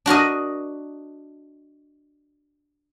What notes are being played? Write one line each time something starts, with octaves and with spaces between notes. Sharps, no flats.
D4 F#4 A#4 D#5